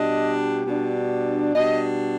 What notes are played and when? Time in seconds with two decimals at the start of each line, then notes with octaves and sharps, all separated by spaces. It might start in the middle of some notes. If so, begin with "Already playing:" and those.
Already playing: B2 G3 D4 D#5
0.67 B2 G3 D4
1.55 B2 G3 D4 D#5